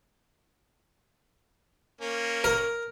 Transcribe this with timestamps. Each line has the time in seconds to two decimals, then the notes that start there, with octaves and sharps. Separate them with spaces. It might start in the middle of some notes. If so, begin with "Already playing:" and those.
2.01 A#3 C#4
2.44 A#4